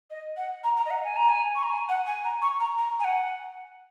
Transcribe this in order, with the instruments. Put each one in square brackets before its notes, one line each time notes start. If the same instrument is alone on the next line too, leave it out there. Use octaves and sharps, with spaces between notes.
[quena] D#5
F#5
A#5
A#5
D#5
F#5
G#5
A#5
G#5
C#6
A#5
G#5
F#5
G#5
A#5
C#6
A#5
A#5
G#5
F#5